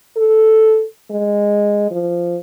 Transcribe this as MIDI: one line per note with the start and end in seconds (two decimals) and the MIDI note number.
0.17 0.84 69
1.11 1.89 56
1.91 2.38 53